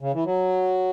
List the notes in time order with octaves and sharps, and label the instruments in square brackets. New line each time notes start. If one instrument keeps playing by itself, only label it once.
[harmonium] C#3
E3
F#3